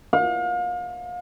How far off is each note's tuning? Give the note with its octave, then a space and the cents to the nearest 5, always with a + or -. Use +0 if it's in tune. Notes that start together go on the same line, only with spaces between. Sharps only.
F5 +35